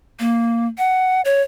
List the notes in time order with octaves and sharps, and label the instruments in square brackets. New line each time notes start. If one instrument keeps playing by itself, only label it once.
[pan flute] A#3
F#5
C#5